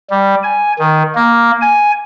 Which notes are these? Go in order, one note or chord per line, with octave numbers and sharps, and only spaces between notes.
G3
G#5
D#3
A#3
G#5